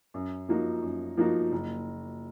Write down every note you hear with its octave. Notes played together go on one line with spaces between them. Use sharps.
F#2
F3 A#3 D#4 F#4
F#2
F3 A#3 D#4 F#4
F#1